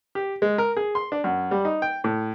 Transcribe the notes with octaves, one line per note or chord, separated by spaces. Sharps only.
G4
G#3
A#4
G#4
C6
D4
F#2
G3
D#4
G5
A2